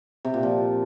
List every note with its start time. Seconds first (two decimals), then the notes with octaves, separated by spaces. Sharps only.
0.25 C3
0.34 A#2
0.43 F3